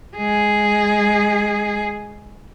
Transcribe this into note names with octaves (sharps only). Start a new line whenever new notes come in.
G#3 G#4